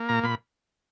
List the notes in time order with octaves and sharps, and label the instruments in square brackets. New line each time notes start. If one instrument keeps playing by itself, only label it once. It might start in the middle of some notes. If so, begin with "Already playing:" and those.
Already playing: [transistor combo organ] A#3
A#2 A#5
A#2 B5